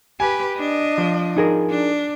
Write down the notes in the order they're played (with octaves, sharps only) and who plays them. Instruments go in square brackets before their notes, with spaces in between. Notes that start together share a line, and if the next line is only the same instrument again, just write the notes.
[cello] G4 B4 [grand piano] G#5
[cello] D4 D#5
[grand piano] F3
[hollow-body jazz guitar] D#4 G#4 A#4
[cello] D4